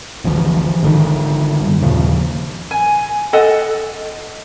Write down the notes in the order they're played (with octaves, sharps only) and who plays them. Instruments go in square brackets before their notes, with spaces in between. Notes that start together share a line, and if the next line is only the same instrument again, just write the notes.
[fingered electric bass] G#1 D2 E3 F3
G#1 D3 D#3
F#1 G2
D#2 A#2 C#3 F3
[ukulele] G#5
A4 D#5 F#5